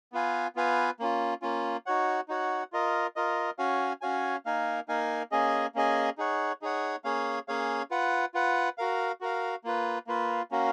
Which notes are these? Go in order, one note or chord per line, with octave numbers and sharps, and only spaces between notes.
B3 F4 B4 F5 G#5
B3 F4 B4 F5 G#5
A#3 C#4 F4
A#3 C#4 F4
D#4 F#4 C#5 F#5
D#4 F#4 C#5 F#5
F4 A#4 D#5
F4 A#4 D#5
C#4 F#4 C#5 F5 G#5
C#4 F#4 C#5 F5 G#5
A#3 D#4 A#4 F5 G#5
A#3 D#4 A#4 F5 G#5
A#3 C#4 G#4 D#5 G#5
A#3 C#4 G#4 D#5 G#5
D#4 G#4 C#5 F#5
D#4 G#4 C#5 F#5
A#3 C#4 G#4 C#5 F5
A#3 C#4 G#4 C#5 F5
F4 B4 F#5
F4 B4 F#5
F#4 A#4 F5
F#4 A#4 F5
A#3 F4 B4
A#3 F4 B4
A#3 C#4 F#4 A#4 F5